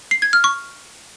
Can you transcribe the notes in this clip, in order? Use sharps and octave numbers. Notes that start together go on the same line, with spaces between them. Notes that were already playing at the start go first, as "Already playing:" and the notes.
C7
G#6
F6
C#6